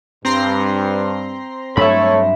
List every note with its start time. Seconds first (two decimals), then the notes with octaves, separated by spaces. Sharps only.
0.25 G2 C4 A#5 C6
1.77 G2 F#3 A3 D4 A4 C#5 E5 B5